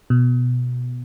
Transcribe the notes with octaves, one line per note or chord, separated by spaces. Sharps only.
B2